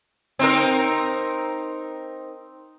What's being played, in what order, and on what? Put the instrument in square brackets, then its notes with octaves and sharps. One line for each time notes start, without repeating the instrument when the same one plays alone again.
[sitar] C4 D#4 A#4